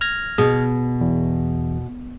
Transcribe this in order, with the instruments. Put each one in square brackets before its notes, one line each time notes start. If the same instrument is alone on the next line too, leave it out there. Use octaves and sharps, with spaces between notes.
[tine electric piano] F6 G#6 A#6
[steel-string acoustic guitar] B2 [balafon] G#4
[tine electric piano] E2